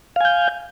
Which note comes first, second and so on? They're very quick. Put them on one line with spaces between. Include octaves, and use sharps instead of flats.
F5 G#5 G6